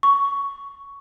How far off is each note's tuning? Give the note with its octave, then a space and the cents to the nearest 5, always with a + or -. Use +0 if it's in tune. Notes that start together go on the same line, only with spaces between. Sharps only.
C#6 +10